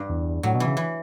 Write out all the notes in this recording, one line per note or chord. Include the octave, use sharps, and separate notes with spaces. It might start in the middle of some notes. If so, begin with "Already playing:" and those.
Already playing: G2
E2
A2 F#3
B2
E3
C#3
E3